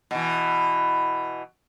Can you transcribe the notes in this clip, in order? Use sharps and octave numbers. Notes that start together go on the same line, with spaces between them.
B2 E3